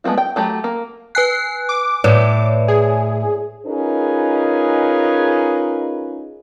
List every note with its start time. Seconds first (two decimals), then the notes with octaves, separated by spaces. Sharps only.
0.04 G#3 A3 B3 C4 F4
0.18 G5
0.36 F#3 A3 G4 B5
0.64 A#3
1.15 B4 G#5 F#6 C7
1.69 D6
2.04 A2 B4 C#5 D5
2.68 G#4
3.66 C#4 D#4 F4 G#4 A#4 B4